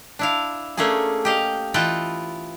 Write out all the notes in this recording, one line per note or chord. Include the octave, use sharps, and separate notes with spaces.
D4 E4 F5
A3 A#3 C#4 D4 G#4
G4 D#5 F5
E3 F4 B4 D#5 G5 A5